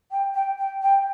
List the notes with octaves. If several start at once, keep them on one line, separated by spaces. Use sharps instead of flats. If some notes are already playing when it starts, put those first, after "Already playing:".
G5
G5
G5
G5